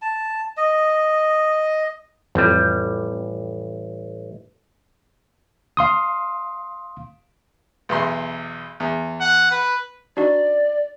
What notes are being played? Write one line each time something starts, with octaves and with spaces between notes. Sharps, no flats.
A5
D#5
A1 F2 G3
F5 C6 D#6
B1 E2 C6
E2
F#5
B4
D4 D#4 F#4 D5